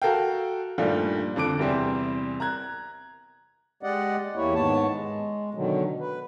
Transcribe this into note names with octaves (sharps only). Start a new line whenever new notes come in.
F#4 A4 A#4 F5 G5
G2 A#2 D#3 F3 G3 A3
F2 D3 D6 D7
E2 C3 E3 G3 C4 E4
A#5 F#6 G#6
G#3 G4 D5 D#5 F#5
E2 A#3 E4 G4 C#5
G#2 D#3 B3 C#5 A5
G#3
B2 D3 D#3 F#3
B4